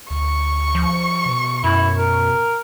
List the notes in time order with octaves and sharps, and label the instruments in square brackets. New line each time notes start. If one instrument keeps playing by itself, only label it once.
[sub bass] D2 [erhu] C#6
[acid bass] F3
[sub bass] B2
[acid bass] F#2 [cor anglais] E4
[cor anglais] A#4